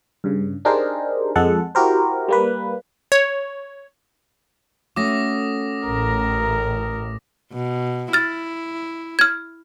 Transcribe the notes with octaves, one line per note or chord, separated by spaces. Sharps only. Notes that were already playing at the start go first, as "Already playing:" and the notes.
G2 C#3
D4 D#4 G4 G#4 A#4 C5
F2 G#3 A4 F#5
E4 F#4 G4 A#4 C5
G3 A#3 B4
C#5
A3 C#4 F#4 D6 D#6 A#6
A1 A2 A#4
B2
E4 F6 A6
F6 G#6